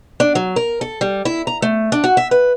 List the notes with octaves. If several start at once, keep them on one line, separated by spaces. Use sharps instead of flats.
D4
F#3
A#4
A4
G3
E4
A#5
A3
D4
F#4
E5
B4